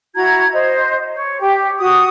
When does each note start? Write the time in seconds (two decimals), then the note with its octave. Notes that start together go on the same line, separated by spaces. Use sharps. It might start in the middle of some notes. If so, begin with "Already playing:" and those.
0.15 E4 F#4 A#5 G#6
0.52 C5 D#5
1.14 C#5
1.40 G4 G5
1.79 F#4 D#6